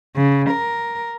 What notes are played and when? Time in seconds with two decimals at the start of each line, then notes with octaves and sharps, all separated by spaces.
0.16 C#3
0.50 A#4